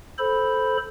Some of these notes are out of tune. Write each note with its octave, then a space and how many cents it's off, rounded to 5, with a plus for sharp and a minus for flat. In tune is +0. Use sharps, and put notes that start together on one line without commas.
A4 -10 C5 +0 B5 +0